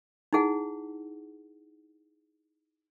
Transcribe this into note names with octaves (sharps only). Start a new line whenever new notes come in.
D#4 E4 G#4 F#5